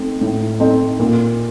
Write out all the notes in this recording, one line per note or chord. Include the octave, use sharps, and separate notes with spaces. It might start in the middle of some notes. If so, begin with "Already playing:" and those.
Already playing: A3 C4 D#4
A2
A3 C4 D#4
A#2